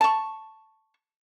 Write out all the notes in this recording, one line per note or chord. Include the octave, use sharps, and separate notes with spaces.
A5 C#6